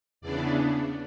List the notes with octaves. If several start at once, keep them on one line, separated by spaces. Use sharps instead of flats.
E2 C#3 E3 B3 D4 D5